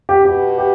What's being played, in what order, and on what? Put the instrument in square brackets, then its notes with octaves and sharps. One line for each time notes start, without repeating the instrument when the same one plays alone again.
[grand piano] G4
[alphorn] B2 [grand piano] G4
[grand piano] G4